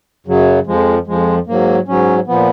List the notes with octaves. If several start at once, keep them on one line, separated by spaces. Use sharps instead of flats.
F#2 C#3 F#3
F2 F3 G#3
F2 F3 G#3
G#2 F#3 A#3
G#2 F#3 C#4
A#2 F3 B3